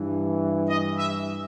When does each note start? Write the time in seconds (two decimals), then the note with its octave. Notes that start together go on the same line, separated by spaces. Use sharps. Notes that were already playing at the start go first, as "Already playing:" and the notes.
Already playing: G2 E3
0.68 D#5
0.98 E5